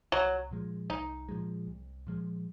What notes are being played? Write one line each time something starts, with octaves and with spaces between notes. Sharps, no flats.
C2 F#3
A#2 F3 G#3
C2 D#4
A#2 F3 G#3
C2
A#2 F3 G#3